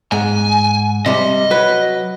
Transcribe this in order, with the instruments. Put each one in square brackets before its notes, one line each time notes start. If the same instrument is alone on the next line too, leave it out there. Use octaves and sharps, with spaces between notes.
[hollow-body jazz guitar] G#2 [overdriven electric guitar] G#5
[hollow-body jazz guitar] C3 G3 [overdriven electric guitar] D#5
[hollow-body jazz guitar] F#3 B4